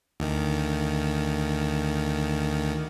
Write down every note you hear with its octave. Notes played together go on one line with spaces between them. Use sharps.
D2 D#3